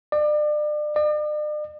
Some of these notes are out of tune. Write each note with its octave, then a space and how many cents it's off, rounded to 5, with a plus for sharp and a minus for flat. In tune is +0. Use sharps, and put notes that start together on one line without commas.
D5 +35
D5 +45